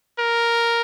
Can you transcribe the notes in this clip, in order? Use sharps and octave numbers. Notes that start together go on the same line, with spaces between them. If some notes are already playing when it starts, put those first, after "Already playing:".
A#4